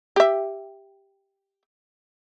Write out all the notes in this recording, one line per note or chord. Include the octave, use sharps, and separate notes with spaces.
G4 E5